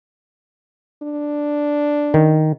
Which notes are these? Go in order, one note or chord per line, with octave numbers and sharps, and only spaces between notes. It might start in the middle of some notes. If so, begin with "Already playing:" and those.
D4
D#3